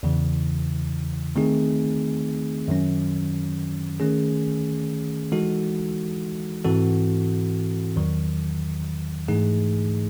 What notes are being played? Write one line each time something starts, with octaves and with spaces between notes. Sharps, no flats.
E2 C#3 E3
D#3 A3 C4 D#4 G#4
F#2 D#3 F#3 C#4
D#3 A3 C#4 G#4
E3 G#3 D#4 F#4 A4
G#2 E3 C4 F#4 A4
E2 D#3 F#3
G#2 E3 A3 D#4 G#4